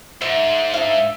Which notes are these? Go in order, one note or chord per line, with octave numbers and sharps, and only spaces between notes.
G#2 E5
D4 E5 F5